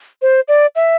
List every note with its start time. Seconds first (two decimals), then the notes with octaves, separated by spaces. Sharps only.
0.22 C5
0.48 D5
0.76 E5